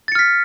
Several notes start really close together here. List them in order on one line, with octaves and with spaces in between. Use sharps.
A6 C#7 F6 B6